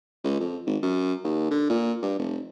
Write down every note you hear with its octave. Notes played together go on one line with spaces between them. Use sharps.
C#2
F2
G#1
F#2
D#2
D3
A#2
G2
F1